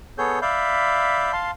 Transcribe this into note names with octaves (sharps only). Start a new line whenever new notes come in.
B3 G#4 A4 C#5 G6
D5 E5 F5 B5 G6
F5 A5 C6